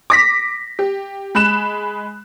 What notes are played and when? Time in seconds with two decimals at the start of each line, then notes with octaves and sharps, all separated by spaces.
0.10 D6 A#6 B6
0.79 G4
1.35 G#3 B5 F#6 E7